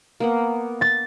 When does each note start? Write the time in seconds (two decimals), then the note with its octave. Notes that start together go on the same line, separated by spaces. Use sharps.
0.20 A#3 B3 F#5
0.81 A6